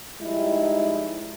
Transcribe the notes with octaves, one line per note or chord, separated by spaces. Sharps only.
F3 G3 G#3 D#4 E4